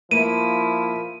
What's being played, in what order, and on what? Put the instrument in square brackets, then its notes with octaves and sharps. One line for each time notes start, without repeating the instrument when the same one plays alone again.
[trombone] F3 [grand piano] A#3 [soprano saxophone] E4 [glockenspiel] D#7